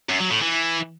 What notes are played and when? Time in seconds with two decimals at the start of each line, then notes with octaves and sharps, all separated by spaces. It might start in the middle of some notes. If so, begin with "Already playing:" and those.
0.09 F#2
0.20 F#3
0.31 A2
0.42 E3